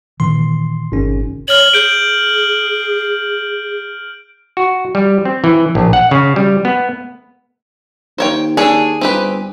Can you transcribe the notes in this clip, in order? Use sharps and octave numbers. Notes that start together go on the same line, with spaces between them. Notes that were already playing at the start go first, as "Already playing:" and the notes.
A#2 D#3 E3 C6
G1 C#4
C#5 F6 F#7
G#4 G6 D7
F#4
G3
C4
E3
A#1
F#5
C#3
G3
B3
D#2 C5 C#5 G5
D4 G#4 A4 C#5
G1 C4 G4 B4